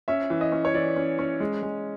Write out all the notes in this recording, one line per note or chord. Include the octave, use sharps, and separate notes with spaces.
C#4 E5
E3
D#5
C#4
C#5
E3 D5
C#4
C#4
G#3
G#3